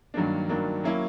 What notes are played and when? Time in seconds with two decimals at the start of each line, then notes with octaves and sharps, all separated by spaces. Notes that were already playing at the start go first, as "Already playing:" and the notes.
0.14 G2 D#3 F#3 A#3 D4
0.49 G2 D#3 F#3 A#3 D4
0.84 F#3 A#3 C#4 E4